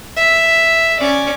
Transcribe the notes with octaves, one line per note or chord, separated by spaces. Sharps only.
E5
C#4 D5